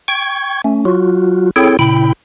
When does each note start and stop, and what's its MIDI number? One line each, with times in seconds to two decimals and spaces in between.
0.08 0.62 79
0.08 0.62 85
0.08 0.62 92
0.64 0.85 57
0.64 0.85 61
0.85 1.51 54
0.85 1.51 65
0.85 1.51 66
1.56 1.77 60
1.56 1.77 64
1.56 1.77 68
1.56 1.77 69
1.56 1.77 73
1.56 1.77 79
1.79 2.13 46
1.79 2.13 49
1.79 2.13 64
1.79 2.13 79
1.79 2.13 83